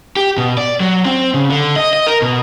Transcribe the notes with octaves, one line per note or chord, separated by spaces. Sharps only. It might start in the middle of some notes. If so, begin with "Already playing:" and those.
G4
B2
D5
F#3
C4
C#3
D3
D#5
D#5
A#4
B2